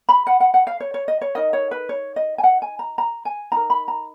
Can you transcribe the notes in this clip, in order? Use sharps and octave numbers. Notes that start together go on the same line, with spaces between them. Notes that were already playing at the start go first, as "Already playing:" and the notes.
B5
F#5
F#5
F#5
F5
C#5
C#5
D#5
C#5
D#4 A#4 D#5
C#5
B4
C#5
D#5
G#5
F#5
G#5
A#5
A#5
G#5
D#4 A#4 A#5
B5
A#5